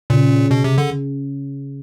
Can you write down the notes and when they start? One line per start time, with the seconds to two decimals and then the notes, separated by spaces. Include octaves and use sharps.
0.10 A#2 C#3
0.51 B2
0.64 C3
0.78 D3